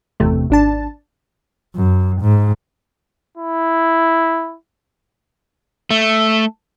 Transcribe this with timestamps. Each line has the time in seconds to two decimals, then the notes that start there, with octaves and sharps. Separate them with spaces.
0.20 G1 E2 C3 A3
0.50 G#1 D4 A5
1.76 F#2
2.22 G#2
3.37 E4
5.91 A3